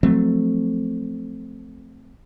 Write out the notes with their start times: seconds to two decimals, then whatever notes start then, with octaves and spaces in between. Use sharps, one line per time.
0.03 F3 F#3 A3 C4